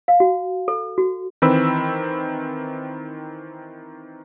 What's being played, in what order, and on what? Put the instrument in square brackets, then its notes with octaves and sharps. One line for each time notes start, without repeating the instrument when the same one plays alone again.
[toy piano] F5
F#4
A4
F#4
[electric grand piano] D#3 E3 C4 B4 B5 E6